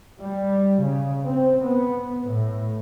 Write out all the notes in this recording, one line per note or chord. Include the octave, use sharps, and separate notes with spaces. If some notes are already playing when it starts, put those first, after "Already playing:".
G3
C#3
C4
B3
A2